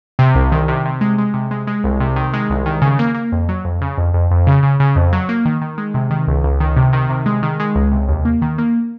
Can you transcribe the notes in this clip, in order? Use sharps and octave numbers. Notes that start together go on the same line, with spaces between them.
C3
C2
D#3
C3
C3
G#3
G#3
C3
G#3
G#3
C2
C3
D#3
G#3
C2
D#3
C#3
A#3
A#3
F2
F#3
F2
C#3
F2
F2
F2
C#3
C#3
C#3
F2
F#3
A#3
D#3
D#3
G#3
C3
D#3
C#2
C#2
D#3
C3
D#3
C3
G#3
D#3
G#3
C#2
C3
D#2
A#3
D#3
A#3